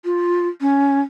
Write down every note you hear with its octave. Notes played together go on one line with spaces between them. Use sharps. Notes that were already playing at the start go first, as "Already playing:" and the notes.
F4
C#4